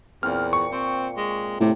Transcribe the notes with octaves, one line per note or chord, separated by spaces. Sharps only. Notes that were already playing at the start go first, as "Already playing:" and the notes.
E2 A#2 A#3 C4 F6
C#6
C4 C6
G#3
A2 C3